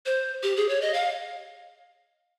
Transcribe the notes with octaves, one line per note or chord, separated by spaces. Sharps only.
C5
G4
G#4
C#5
D#5
F5